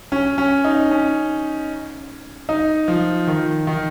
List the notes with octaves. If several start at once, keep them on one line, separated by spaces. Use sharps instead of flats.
C#4
C#4
D#4
C#4
D#4
F3
D#3
D#3